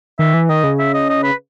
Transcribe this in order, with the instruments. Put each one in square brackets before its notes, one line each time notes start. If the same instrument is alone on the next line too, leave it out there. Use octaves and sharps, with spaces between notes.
[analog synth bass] D#3 [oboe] E5
[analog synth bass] E3
[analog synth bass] D#3 [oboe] D#5
[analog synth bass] C#3
[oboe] E5
D#5
D#5
B4